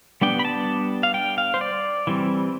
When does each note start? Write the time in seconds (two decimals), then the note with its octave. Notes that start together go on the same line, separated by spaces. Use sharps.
0.21 G3 B3 D4 G5
0.39 B5
0.45 A5
1.03 F5
1.14 G5
1.38 F5
1.54 C5
1.61 D5
2.07 E3 G3 C4